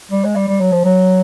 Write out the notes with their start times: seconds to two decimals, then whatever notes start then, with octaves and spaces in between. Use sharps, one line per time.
0.11 G3
0.24 G#3
0.35 G3
0.48 G3
0.60 F#3
0.72 F3
0.85 F#3